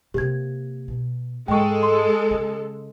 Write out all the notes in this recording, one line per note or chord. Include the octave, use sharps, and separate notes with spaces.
C3 A#3 G4 G#6
B2
G#2 G#3 A4 G5 C#6
C6
C#3